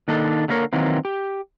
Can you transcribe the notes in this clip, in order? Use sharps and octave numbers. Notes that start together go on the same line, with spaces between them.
D#3 A#3 D4 D#4 A4
D3 A3 A#3 A#4 C#5
D#3 E3 F#3 A#3 C4
G4